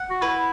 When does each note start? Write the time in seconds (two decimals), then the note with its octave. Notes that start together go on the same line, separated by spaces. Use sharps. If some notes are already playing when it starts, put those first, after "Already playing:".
Already playing: F#5
0.10 F#4
0.22 E4 B4